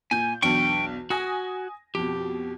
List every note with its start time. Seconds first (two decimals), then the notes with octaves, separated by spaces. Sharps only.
0.11 A#2 G#5 G6
0.42 B1 E2 D4 G5 C#6
1.10 F#4 G#5 D#6 A#6
1.95 F2 B2 G4